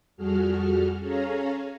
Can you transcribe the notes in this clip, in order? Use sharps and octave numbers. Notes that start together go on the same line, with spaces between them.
F2 G3 F#4 G#4 A4 F6
C#4 G#4 A4 C#5 F5 A#5